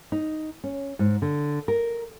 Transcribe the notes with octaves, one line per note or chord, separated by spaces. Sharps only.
D#4
C#4
G#2
D3
A#4